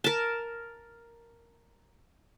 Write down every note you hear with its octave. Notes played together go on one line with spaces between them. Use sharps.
A#4 A5